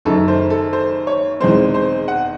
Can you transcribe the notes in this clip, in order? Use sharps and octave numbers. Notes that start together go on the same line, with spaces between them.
F#1 F#2 D#3 A4
C5
A4
C5
C#5
E1 E2 D#3 G#3 C4 C5
C5
F#5